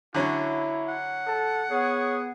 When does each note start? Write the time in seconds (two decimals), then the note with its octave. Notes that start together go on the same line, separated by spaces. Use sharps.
0.14 D3 F#3 C#4 E4
0.88 F#5
1.26 A4
1.71 B3 G#4 C#5